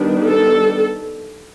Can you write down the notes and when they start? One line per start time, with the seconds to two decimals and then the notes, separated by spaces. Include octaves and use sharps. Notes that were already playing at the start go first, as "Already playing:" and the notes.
Already playing: D#3 G3 B3 D4
0.26 A4